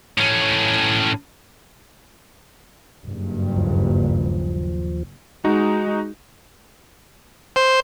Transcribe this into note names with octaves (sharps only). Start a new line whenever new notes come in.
A2 C#4
F#1 G2
D#2 F3
G#3 D#4 F#4
C5